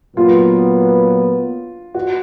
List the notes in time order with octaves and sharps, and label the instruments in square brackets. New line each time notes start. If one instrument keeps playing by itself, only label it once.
[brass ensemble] A#2 F#3 B3 [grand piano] F4
[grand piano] F#4